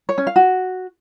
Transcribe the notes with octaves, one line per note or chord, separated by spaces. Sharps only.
C#5
C#4
F5
F#4